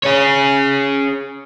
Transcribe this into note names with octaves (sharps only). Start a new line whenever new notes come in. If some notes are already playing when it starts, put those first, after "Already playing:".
G#4 C#5